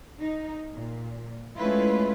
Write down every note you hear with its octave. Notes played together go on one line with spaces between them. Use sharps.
D#4
A#2
G#3 A3 C#4 E4 F4 B4